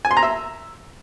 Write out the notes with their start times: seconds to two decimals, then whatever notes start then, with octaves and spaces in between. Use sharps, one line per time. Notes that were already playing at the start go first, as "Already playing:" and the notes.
0.05 G#5
0.11 C6
0.17 A#5
0.23 E5